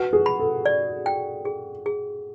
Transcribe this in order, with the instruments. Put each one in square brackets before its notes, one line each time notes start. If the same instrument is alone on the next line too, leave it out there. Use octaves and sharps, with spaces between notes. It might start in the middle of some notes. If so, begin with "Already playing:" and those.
Already playing: [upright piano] F#4 [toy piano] B4
[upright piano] G#4
[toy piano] B5
[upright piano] A4
[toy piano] D5
G5
G#4
G#4